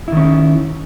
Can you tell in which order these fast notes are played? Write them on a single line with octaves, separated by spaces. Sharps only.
E4 D#3 C#4